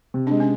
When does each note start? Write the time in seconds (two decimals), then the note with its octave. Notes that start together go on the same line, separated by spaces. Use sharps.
0.14 C3
0.27 G#3 D4
0.40 C#4